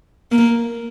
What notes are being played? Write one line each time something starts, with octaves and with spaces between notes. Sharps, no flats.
A#3